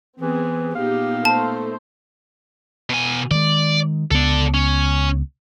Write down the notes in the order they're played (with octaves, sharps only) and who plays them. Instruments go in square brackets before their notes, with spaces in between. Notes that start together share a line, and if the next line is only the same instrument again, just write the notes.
[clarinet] E3 [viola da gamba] B3 [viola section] C4 G#4
[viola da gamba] A#2 B3 D#4 [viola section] G4 [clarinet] F5
[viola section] A3 C5 [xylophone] A5
[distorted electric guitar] B2 G#5
[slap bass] D#3 G#3 [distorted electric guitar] D5
[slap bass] C#2 B3 [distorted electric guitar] A4 D5
[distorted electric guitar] C#4